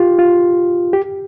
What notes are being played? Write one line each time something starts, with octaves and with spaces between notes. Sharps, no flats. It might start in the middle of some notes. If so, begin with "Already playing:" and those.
Already playing: F4 G4
F4
G4